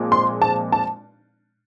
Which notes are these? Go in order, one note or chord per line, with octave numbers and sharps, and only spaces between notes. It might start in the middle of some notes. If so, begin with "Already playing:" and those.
Already playing: A#2 F3 G#3 C4
C6
A5
A5